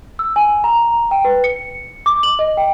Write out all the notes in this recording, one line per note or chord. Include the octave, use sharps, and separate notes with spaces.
E6
G#5
A#5
G5
B4
C#7
D6
F#7
D#5
G5